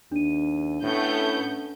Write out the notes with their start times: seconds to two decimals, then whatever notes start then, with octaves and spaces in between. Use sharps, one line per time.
0.12 D#2 D4 D#7
0.83 A2 A3 B3 C#4 G6